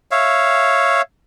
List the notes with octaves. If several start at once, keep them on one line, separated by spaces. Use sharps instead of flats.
C#5 E5 F5